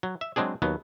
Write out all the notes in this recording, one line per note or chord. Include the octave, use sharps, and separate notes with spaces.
F#3
E5
F#3 G#3 C4 D4 G#4
D#2 F#3 B3